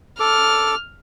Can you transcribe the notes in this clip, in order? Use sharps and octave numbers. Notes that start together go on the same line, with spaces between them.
A4 D6 F6